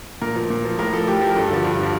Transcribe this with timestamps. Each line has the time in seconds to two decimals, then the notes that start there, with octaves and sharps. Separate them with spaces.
0.21 A#2 A#4
0.36 F3
0.50 A#2
0.65 F3
0.79 A2 A#4
0.93 F3 A4
1.07 A2 G4
1.21 F3
1.30 A#4
1.36 G2 A4
1.50 D3 F3
1.64 G2
1.79 D3 F3